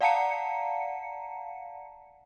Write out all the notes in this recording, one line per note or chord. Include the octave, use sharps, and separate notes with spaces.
D5 F5 F#5 A5 A#5 C#7